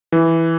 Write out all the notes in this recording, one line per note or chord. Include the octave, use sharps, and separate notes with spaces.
E3